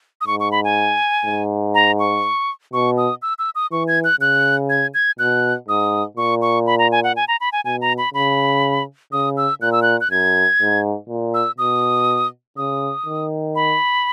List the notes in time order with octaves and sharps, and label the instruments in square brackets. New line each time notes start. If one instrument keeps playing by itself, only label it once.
[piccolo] D#6
[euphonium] G#2 [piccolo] C#6
[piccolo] C#6
B5
G#5
[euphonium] G#2
[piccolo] A#5
C#6
[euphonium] B2 [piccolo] C#6
[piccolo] D#6
E6
E6
D#6
[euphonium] E3 [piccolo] C#6
[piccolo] G#6
F#6
[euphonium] C#3 [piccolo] F#6
[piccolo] G#6
G#6
[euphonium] B2 [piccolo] F#6
[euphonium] G#2 [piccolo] D#6
[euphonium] A#2 [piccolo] C#6
[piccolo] C#6
B5
A#5
G#5
F#5
G#5
A#5
B5
G#5
[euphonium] B2 [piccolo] G#5
[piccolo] A#5
B5
[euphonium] C#3 [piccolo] B5
[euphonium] C#3 [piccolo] D#6
[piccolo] E6
[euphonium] A#2 [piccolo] F#6
[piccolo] E6
F#6
F#6
[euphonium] F#2 [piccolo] G#6
[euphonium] G#2
A#2
[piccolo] E6
[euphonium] B2 [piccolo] D#6
[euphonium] C#3 [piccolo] D#6
[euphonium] D#3
[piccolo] B5